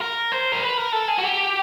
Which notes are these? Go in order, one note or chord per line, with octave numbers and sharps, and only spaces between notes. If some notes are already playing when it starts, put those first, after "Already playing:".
A#4
C5
A#4
B4
A#4
A4
G#4
F#4
G4